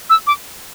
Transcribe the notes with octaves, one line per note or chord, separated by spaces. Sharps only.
E6
D6